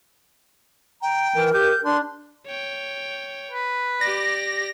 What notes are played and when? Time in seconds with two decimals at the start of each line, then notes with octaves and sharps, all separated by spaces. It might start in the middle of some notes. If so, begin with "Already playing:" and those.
1.02 G5 A#5
1.35 E3 A#4
1.54 G4 G6
1.84 D4 C6
2.46 C#5 G5
3.51 B4
4.01 G4 D5 A#6